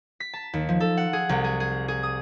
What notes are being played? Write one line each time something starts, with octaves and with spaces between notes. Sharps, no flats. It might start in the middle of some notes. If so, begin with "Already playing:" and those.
B6
A5
D#2
F3
A4
F#5
G#4
C2
G#4
G#4
G#4
D#6